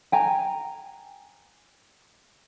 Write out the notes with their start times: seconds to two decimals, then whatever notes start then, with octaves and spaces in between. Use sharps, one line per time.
0.12 G5 G#5 A#5